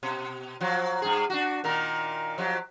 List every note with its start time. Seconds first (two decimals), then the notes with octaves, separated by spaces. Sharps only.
0.03 B2
0.61 F3 F#3
1.02 G2 G#4
1.30 D4 F#4
1.64 A#2 D#3 A#4
2.38 F3 F#3 G4